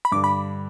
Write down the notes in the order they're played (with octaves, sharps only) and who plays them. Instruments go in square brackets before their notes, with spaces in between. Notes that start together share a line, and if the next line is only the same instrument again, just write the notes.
[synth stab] B5
[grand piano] G2 D3 G3 [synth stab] D6
[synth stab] B5